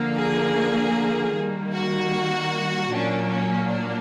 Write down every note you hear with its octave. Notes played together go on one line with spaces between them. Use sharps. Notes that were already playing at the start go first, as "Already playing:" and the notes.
Already playing: D3 F3 A#3
G#4
D#3 G3 A#3
F#4
A#2 F#3 A#3 C#4 D4
C#4
D4